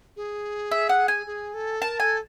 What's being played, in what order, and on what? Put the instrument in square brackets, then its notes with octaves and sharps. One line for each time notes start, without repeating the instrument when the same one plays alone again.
[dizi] G#4
[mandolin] E5
F#5
G#5
[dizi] G#4
A4
[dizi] A#4 [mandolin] A5
[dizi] A4 [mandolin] G#5